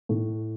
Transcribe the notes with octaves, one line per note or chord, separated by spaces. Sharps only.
A2